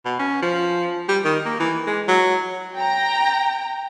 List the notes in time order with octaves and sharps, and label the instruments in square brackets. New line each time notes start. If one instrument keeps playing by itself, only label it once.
[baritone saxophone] B2
C#4
F3
G3
D#3
A#3
E3
G#3
F#3
[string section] G5 A#5